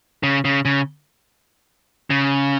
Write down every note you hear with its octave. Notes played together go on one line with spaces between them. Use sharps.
C#3
C#3
C#3
C#3